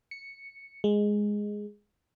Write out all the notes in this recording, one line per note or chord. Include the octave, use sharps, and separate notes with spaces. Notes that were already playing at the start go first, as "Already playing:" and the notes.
C#7
G#3